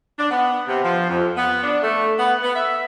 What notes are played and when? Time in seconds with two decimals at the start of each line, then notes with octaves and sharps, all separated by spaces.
0.19 D4
0.31 B3
0.68 C3
0.83 F3
1.10 F2
1.37 B3
1.63 D4
1.83 A3
2.19 B3
2.42 B3
2.56 E5